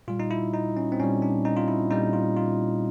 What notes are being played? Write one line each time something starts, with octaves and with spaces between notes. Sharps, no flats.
A#2 G3 F4
D#4
E4
D#4
C#4
C4
A#2 G3 C#4
D4
D#4
F4
E4
A#2 G3 D#4
F4
F4